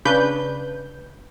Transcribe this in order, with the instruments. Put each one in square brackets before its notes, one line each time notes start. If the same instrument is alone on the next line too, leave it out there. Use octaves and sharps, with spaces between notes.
[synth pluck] C#3 D4 B4 G6